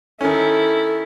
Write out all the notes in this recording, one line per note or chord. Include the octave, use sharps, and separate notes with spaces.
D#3 C#4 E4 A4